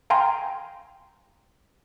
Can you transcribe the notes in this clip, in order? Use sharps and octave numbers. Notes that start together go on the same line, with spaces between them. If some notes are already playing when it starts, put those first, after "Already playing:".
F5 G5 G#5 A#5 C6